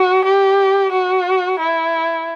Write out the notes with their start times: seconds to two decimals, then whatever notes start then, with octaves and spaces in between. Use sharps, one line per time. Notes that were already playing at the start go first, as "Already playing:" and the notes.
Already playing: F#4
0.25 G4
0.92 F#4
1.59 E4